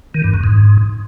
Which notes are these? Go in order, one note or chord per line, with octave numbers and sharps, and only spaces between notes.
D#3
G2
F#2
G#2